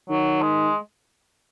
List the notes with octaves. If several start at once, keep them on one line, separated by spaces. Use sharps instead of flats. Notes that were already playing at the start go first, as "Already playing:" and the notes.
D#3 F#3
G#3